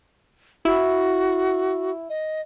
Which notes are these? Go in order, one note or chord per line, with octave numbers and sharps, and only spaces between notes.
E4 F#4
D#5